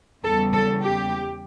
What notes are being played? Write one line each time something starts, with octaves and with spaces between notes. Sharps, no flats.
E2 C#3 G3 A4
A4
G4